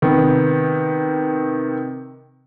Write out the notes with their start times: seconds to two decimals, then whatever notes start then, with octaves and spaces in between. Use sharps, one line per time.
0.02 C3 D#3 B3